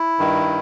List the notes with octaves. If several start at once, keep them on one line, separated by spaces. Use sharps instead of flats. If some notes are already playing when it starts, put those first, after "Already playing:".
Already playing: E4
G2 D#3